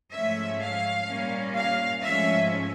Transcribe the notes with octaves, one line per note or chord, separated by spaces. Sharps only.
G#2 F3 A3 C#4 E5
F5
A#2 G3 A#3 C#4
F5
G#2 F3 A3 C#4 E5